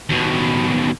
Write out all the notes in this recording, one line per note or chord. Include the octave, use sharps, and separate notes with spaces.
D#2 B2